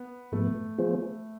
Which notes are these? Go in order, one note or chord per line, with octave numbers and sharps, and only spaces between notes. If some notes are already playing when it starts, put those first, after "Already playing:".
Already playing: B3
G#2 F3 A3 B3
F3 B3 F4 G#4 C5